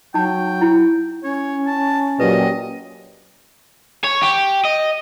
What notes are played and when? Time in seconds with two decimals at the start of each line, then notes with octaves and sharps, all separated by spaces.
0.14 F#3 D#4 G5 A5
0.61 E4
1.23 C#4 C#5
1.66 A5
2.20 A#2 F#3 G4 B4 D#5
4.04 C#5
4.23 G4
4.65 D#5